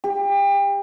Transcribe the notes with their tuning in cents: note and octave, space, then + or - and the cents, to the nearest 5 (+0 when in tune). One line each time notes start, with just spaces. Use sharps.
G4 +30